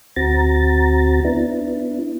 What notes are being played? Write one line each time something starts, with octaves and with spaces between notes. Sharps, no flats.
D2 C4 F#4 A#5 A6
B3 D4 E4